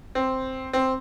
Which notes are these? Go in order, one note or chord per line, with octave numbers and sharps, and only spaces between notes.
C4
C4